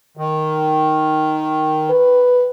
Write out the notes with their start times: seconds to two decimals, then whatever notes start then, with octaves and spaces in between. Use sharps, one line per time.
0.17 D#3
1.90 B4